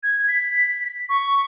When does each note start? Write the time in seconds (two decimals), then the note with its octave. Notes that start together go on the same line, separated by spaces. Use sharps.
0.03 G#6
0.28 B6
1.09 C#6